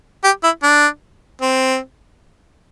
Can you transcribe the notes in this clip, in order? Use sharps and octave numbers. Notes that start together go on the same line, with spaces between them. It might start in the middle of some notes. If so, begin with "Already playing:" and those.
G4
E4
D4
C4